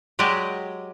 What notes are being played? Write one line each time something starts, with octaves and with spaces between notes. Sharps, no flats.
F#3 G#3 G4 D5 D#5